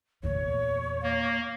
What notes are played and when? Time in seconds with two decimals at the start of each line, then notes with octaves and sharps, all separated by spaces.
0.23 E2 A#2 C#5
1.03 A#3